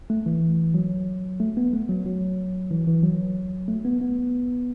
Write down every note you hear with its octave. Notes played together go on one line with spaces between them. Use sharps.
A3
E3
F#3
A3
B3
A3
F#3
F#3
E3
E3
F#3
A3
B3
B3